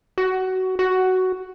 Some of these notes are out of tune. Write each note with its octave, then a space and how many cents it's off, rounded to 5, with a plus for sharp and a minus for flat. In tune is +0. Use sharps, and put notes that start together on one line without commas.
F#4 +20
F#4 +10